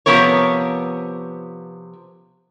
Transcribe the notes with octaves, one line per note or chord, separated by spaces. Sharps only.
C3 F3 B3 A#4 C#5